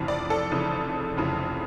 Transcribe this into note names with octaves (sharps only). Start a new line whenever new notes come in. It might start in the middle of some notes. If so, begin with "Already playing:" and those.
Already playing: F1 F2 C#3 E3
D5
A4
F1 F2 C#3 E3
F1 F2 C#3 E3